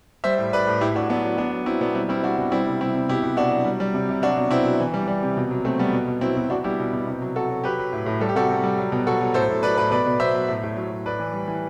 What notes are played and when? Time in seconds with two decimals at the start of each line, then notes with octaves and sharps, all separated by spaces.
0.24 G3 C5 E5
0.38 A2
0.52 A2 B4 D5
0.67 A2
0.81 A2 E4 G4
0.95 A2 D4 F#4
1.09 F#3 B3 D4
1.24 F#3
1.37 F#3 B3 D4
1.53 F#3
1.66 F#3 C4 E4
1.81 B2 B3 D4
1.94 G3 C4 E4
2.09 G3 C4 E4
2.23 G3 D4 F#4
2.38 B2
2.52 G3 C4 E4
2.66 C3
2.80 G3 C4 E4
2.95 C3
3.09 B2 E4 G4
3.23 B2
3.37 B2 D4 F#4
3.51 F#3
3.65 G3
3.80 G3
3.94 C3
4.09 C3
4.22 F#3 D4 F#4
4.37 B2
4.51 B2 C4 E4
4.65 F#3
4.80 E3
4.94 G3
5.07 G3
5.23 C3
5.37 B2
5.51 F#3
5.65 F#3 A3 C4
5.79 B2 G3 B3
5.93 B2
6.08 B2
6.21 F#3 C4 E4
6.37 B2
6.50 B2 D4 F#4
6.64 G3 E4 G4
6.79 B2
6.93 B2
7.07 C3
7.21 F#3
7.36 F#3 F#4 A4
7.50 F#3
7.64 F#3 G4 B4
7.79 F#3
7.93 A2
8.06 A2
8.20 G3 A4
8.29 G4
8.35 C3 F#4 A4
8.49 C3
8.63 G3
8.78 F#3
8.92 B2
9.07 F#3 F#4 A4
9.21 F#3
9.34 A2 A4 C5
9.49 A2
9.63 F#3 B4 D5
9.77 A2 B4 D5
9.91 B2 B4 D5
10.06 B2
10.20 F#3 C5 E5
10.34 F#3
10.48 A2
10.63 A2
10.77 F#3
10.91 F#3
11.06 A2 B4 D5
11.20 E3
11.34 G3
11.48 E3